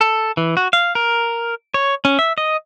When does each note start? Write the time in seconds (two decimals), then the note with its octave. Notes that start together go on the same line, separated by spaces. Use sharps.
0.01 A4
0.37 E3
0.57 F#4
0.73 F5
0.95 A#4
1.74 C#5
2.05 C#4
2.19 E5
2.38 D#5